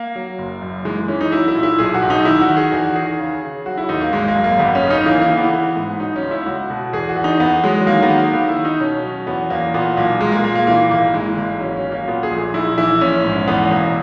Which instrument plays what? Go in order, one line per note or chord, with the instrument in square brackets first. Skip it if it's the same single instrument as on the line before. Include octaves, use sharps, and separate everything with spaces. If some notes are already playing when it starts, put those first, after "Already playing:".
Already playing: [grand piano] A#3
F#3
F#1
F#2
E3 G#3
E3 C#4
D#4
F#3 E4
E4
A#2
E4
B1 G#4
F#4
B1
D#4
D#3 E4
F#4
D#3
G#4
E2 F#4
D#3 G#4
C#3
C#3
F#3 F#4
E4
D#2 D#4
A#3
G#1 G#3
A#3
F#2
A#3
G#1 B3
C#4
C#3
D#4
E3 A#3
A#3
E3
B3
E3
G#2
F#3 D#4
C#4
C#2
E4
C#2 F#4
B2
E2 G#4
F#4
E2
D#4
E2 B3
F#3 G#3
D#3 A#3
B3
D#3
A#3
D#3 B3
E4
D#3
D#4
B2 C#4
F#3
E2 B3
E2 A#3
A#2 B3
B1 A#3
A#2 G#3
A#3
A#2 A#3
A#3
E3 A#3
G#1 A#3
E3 G#3
G#1 A#3
F#3 C#4
C#4
F#3
A#3
A#2 B3
G#4
A#1
G#4
A#1 E4
E3 E4
A#1 C#4
G#2
E2 B3
E1 A#3